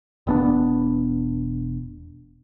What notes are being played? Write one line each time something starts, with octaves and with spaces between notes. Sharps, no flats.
E1 B3 D4